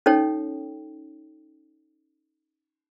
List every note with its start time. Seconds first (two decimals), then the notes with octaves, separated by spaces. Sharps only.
0.06 C#4 D#4 A4 C#5 G5